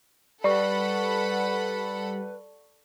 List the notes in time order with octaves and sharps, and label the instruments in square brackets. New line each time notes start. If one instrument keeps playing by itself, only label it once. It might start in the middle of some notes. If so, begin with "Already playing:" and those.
[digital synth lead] G3 [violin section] A4 F#5 B5 [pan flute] B4 [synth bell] D5 C#6